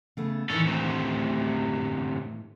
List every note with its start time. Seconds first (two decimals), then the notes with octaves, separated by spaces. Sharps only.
0.17 C#3 A3 B3
0.50 A2 D#3 E3 C#4 A4
0.67 D2 C3